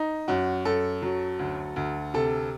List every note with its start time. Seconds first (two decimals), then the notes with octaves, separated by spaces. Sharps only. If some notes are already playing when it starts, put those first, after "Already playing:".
Already playing: D#4
0.28 F#2 F#4
0.65 F#2 A4
1.02 F#3
1.39 D2
1.76 D2
2.14 C3 A4